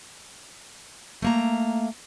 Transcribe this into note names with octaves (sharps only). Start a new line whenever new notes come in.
A3 A#3 A#5